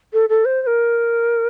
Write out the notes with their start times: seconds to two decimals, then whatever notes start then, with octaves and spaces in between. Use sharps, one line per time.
0.13 A4
0.29 A4
0.45 C5
0.62 C5
0.67 A#4